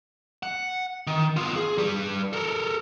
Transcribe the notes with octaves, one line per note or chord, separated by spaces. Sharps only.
F#5
D#3
B3 F4
G#4
G3 B4
A4 A#4